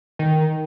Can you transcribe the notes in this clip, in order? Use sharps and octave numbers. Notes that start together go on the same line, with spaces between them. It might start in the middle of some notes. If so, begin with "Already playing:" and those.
D#3